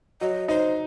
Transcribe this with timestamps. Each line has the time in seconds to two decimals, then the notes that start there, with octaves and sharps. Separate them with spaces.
0.21 F#3 D#5
0.48 D#4 C5